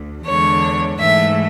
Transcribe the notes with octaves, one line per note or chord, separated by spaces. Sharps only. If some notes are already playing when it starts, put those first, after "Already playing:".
Already playing: D2
E2 D3 G#3 C#5
G#2 E3 A3 E5